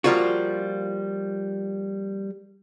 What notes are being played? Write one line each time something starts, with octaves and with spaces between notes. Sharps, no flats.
F3 G3 A#3 F4 F#4